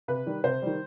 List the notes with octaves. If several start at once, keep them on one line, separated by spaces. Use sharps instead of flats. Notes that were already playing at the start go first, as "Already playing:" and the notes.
C3 B4
D#3 G3
C3 C5
D#3 G3